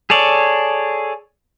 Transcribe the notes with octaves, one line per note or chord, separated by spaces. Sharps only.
G#4 A4 C#5 D5